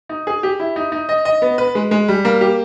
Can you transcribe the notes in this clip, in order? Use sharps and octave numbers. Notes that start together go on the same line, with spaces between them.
D#4
G#4
G4
E4
D#4
D#4
D#5
D#5
B3
B4
G#3
G#3
G3
A#3
G4